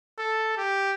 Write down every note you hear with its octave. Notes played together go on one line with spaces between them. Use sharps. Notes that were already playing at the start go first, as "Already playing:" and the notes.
A4
G4